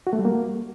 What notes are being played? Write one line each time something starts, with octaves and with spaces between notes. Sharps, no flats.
F#4
A3
G3
A#3